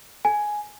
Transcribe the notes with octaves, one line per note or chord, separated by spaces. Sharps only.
G#5